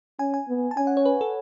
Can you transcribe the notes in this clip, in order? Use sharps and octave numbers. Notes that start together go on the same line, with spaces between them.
C#4 G#5
G#5
B3
A5
C#4 G#5
F#5
C#5
B4
A4